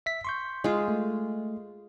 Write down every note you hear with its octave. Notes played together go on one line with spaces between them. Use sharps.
E5 B6
C6 C#6 G6
G#3 F4
A3